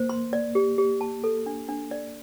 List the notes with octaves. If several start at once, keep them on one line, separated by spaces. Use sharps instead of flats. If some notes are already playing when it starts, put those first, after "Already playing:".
Already playing: A#3 C5
C6
D5
G4
G4
A5
A4
D4
D4
D5